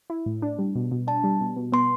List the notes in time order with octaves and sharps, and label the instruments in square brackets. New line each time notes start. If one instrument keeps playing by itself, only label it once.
[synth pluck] E4
A2
D4
G3
B2
B2
[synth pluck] D4 [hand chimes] A5
[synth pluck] G3
B2
B2
[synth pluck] B3 [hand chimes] C6